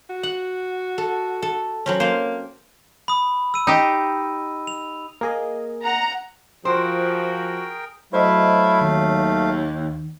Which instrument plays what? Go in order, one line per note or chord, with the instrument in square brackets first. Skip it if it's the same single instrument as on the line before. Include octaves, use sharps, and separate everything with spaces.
[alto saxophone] F#4
[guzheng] F#5
A4
A4
F#3 C4 C#4
[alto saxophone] A#3 [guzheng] C5 F5
[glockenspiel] B5 D#6
E6 D#7
[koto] D#4 G4
[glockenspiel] F7
[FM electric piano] A#3 G#4 D#5 [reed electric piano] A#4
[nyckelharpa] F#5 [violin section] A#5
[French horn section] F3 [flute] F#4 [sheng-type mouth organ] G#4 A#4 G5 [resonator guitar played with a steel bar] C5
[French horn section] F#3 [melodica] A3 F5 [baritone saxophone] E4 [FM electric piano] C5 D#5
[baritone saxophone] D#2 [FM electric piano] D#3